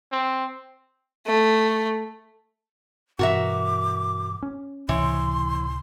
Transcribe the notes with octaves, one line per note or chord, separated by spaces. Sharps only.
C4
A3
G2 B2 E3 F#4 A#4 E5 D6
C#4
C#2 A2 C3 E3 C#5 C6